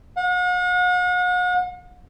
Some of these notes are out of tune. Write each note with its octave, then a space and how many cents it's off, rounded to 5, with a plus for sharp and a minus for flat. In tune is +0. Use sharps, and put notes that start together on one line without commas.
F#5 -45